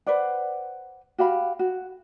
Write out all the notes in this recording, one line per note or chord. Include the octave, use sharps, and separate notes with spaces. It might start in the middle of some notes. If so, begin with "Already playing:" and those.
B4 C5 D5 F#5
F#4 G4 F5 B5
F#4